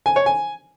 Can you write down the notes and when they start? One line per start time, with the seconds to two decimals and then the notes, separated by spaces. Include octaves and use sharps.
0.06 G#5
0.16 C#5
0.26 G#5